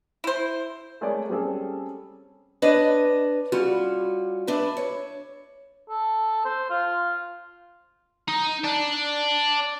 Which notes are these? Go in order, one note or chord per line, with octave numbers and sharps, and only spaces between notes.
E4 C5
G#3 A3 G#4 A#4 C#5 D5
G3 C4 C#4 G#4 A4
D4 B4 C#5 D#5
G3 C#4 F4 F#4
D4 E4 B4
C#5
A4
C5
F4
D#4
D5 A5